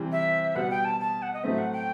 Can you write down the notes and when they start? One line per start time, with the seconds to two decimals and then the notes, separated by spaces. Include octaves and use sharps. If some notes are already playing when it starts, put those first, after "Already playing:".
Already playing: C3 E3 G3 C4
0.11 E5
0.55 B2 G3 B3 F#5
0.70 G5
0.84 A5
1.00 A5
1.22 F#5
1.33 D#5
1.43 A2 F#3 A3 C4 E5
1.58 F#5
1.72 G5